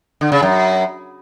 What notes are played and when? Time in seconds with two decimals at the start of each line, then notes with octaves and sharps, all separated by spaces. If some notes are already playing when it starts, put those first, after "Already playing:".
0.21 D3
0.32 C#3
0.42 F#2